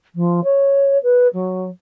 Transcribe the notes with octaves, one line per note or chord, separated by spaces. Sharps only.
F3
C#5
B4
F#3